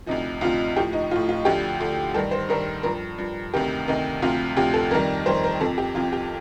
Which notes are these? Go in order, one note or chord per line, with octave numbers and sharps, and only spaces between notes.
D2 C3 F3 D#4
D2 C3 F3 F4
A2 F3 G4
D#4
F3 F4
A2
F4
D2 D3 F3 G4
D2 D3 F3
G2 D#3 G3 A4
C5
G2 D#3 G3 A#4
G2 F3 A#4
G2 F3
D2 C3 D#3 G4
D2 C3 D#3 D#4
D2 C3 F3 F4
D2 C3 F3 G4
A4
F2 D#3 G3 A#4
F2 D#3 G3 C5
A#4
F2 C3 F3 A4
G4
F2 C3 F3 F4
G4